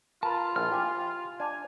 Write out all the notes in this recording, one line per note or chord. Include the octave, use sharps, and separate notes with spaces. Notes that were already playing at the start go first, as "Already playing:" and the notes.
F4 A#4 B4 A5
A#1 E4 F6
G4 G#5
D4 G#5